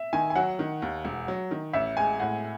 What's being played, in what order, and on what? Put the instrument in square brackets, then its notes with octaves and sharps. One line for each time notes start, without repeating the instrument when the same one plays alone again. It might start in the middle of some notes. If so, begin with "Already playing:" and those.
Already playing: [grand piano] E5
[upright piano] D#3 [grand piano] G#5
[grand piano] G#5
[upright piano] F#3 [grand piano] F#5
[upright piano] D#3
D#2
E1
F#3
D#3
[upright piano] A1 [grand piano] E5
[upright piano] G#3 [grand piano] G#5
[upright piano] A2 [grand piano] F#5